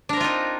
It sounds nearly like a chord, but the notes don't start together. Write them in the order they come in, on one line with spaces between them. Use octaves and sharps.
D4 A#4 C4 F4 D#4